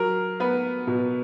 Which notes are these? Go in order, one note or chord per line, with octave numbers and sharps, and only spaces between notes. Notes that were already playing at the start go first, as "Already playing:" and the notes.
Already playing: F#3 A#4
B3 B4
B2